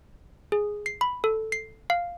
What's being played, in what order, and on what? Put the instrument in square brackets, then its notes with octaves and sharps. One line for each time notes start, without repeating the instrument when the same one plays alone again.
[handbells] G#4
C7
B5
A4
C7
F5